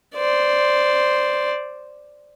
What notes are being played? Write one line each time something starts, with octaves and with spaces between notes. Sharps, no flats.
C5 D5